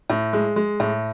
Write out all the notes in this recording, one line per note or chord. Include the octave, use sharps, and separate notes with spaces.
A2
G#3
G#3
A2